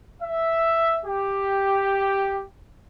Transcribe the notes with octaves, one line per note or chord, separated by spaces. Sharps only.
E5
G4